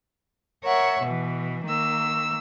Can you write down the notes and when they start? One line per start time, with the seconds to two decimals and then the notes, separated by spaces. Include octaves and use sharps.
0.64 A#4 C#5 E5 F#5
1.01 B2 E3
1.65 D#3 A#3 E6